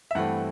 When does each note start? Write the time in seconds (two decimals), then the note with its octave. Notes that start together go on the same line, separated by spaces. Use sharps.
0.11 E5
0.15 G2 E3 A3 C4 F#5